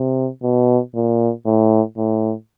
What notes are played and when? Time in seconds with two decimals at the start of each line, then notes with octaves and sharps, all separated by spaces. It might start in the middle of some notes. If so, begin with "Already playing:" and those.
Already playing: C3
0.43 B2
0.95 A#2
1.46 A2
1.98 A2